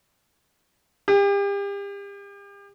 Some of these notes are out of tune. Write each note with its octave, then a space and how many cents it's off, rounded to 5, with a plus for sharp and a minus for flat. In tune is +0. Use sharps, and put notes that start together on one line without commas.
G4 +35